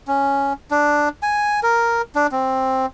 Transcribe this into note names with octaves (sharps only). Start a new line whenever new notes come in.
C#4
D4
G#5
A#4
D4
C4